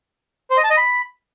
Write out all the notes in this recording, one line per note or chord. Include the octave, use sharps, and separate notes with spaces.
C5
D#5
A5
D#5
B5